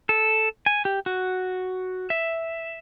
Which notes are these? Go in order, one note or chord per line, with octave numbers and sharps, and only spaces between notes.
A4
G#5
G4
F#4
E5